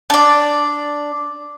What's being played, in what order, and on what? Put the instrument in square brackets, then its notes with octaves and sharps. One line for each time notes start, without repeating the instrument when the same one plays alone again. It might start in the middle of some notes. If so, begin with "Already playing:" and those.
[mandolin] D4 D5